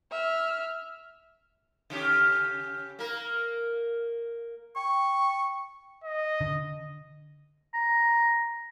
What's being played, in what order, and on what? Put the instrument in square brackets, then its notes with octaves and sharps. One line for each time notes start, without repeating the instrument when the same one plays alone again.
[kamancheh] E5 F6
[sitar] C#3 C#4 G4
A#3 A#4
[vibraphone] G5 [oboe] C#6
[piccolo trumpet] D#5
[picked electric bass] D3
[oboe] A#5